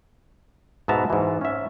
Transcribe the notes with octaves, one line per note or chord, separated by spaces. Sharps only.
G#2 B2 B3 E5 A5 A#5
G#2 E3
C#4 E5